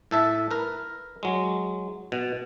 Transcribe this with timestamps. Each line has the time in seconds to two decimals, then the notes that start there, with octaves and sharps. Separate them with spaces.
0.11 A2 A4 E5
0.51 A#4 B4
1.23 F#3 G#3
2.12 B2